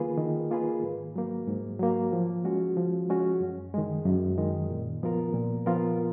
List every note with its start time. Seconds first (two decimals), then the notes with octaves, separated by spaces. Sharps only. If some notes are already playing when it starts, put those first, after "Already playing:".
Already playing: D#3 A#3 F4 G#4 B4
0.18 D#3
0.51 A#3 F4 G#4 B4
0.83 G#2
1.16 F#3 A#3
1.48 G#2
1.79 F#3 A#3
2.13 F3
2.44 G#3 C#4 F#4
2.77 F3
3.09 G#3 C#4 F#4
3.40 F#2
3.74 D#3 G#3
4.05 F#2
4.38 D#3 G#3
4.71 A#2
5.03 F3 B3 F4 A#4
5.34 A#2
5.66 F3 B3 F4 A#4